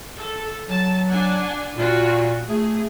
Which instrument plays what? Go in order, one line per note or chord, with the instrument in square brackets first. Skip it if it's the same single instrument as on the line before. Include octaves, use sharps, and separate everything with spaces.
[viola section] A4
[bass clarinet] F#3 [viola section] A5
[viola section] D4 F#5 G#5
[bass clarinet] A#2 [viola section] F4 F#4
[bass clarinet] A3 [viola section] G#4